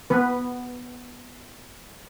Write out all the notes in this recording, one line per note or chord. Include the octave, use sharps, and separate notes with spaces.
B3 B4